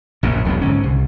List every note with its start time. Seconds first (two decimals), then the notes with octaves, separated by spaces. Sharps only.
0.23 A#1 F#2 A2
0.45 E1 B1 E2 B3
0.61 G#2 D3 C#4
0.83 C2